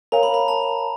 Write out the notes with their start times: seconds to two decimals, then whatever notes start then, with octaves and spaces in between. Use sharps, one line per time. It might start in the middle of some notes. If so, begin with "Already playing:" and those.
0.12 A#4 C#5 F5 G#5 A#5
0.23 B5
0.34 A#5
0.48 A5